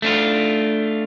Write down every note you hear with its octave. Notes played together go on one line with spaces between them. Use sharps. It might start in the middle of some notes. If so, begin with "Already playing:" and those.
A3 D4 F4